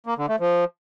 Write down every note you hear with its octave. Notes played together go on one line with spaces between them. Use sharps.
A#3
D3
A3
F3